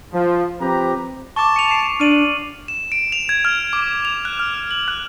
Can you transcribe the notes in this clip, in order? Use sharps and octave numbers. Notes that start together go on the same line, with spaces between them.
F3
F3 C4 G4 B4 A#5
A5 C#6 D6
C#7 D#7 F7
C7 D7 E7
D4 F6 D#7 F#7
E7
D7
F7
G#6
F6
D6
F7
F#6
F6
F#7
F#6